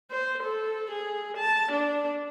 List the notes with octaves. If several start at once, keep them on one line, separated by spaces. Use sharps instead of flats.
C5
A4
G#4
A5
D4